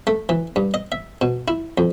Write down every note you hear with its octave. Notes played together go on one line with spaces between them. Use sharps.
A3
E3
G2
D#5
E5
B2
E4
F2